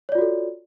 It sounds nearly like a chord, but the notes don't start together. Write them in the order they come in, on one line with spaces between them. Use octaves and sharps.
C#5 D5 F4 F#4 A4